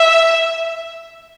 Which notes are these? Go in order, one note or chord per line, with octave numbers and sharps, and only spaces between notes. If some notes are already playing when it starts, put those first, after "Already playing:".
Already playing: E5